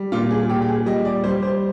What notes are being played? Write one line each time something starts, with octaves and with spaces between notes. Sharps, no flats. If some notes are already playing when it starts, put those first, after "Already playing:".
Already playing: G3
A#2 F4
G#4
A#2 G4
G4
G#4
G3 D#5
D5
G3 C5
C5